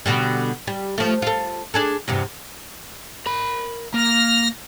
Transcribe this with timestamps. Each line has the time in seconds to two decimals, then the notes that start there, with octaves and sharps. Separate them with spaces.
0.06 B2 D3 G3
0.67 G3
0.98 F3 A3
1.22 F4 A4
1.74 D4 G#4 A4
2.08 E2 G2 C3
3.26 A#4 B5
3.94 A#3 F6 A#6